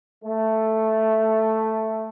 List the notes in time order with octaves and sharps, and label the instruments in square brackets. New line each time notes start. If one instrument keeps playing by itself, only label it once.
[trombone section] A3